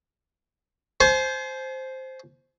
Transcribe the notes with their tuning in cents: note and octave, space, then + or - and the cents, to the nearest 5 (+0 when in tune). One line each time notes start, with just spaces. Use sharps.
C5 +0 G#5 +45